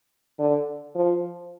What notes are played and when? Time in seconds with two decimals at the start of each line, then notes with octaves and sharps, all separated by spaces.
0.39 D3
0.96 F3